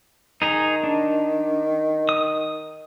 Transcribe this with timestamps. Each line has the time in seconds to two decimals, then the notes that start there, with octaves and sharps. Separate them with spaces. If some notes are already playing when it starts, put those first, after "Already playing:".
0.42 D#3 D#4 G#4 A#5
0.83 D4
2.09 D#6